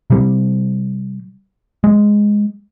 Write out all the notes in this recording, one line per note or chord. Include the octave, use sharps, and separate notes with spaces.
C3 G3
G#3